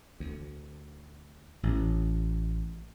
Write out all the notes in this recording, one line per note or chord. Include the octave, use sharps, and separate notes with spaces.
D2
A1